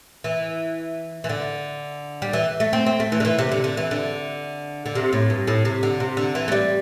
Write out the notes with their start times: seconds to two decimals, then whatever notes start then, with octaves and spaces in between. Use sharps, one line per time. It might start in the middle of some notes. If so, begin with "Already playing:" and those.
0.24 E3
1.24 E3
1.29 D3
2.22 G3
2.33 E3
2.60 A3
2.73 C4
2.86 C4
3.00 A3
3.12 E3
3.20 D3
3.25 E3
3.38 C3
3.52 D3
3.64 D3
3.77 E3
3.91 D3
4.86 D3
4.95 C3
5.13 A2
5.30 G2
5.47 A2
5.65 C3
5.83 D3
6.00 C3
6.17 D3
6.35 E3
6.48 A3
6.52 G3